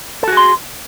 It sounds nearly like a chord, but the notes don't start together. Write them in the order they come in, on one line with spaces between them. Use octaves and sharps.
A4 F#4 G#4 C6